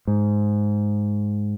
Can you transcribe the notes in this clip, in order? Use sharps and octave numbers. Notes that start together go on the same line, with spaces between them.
G#2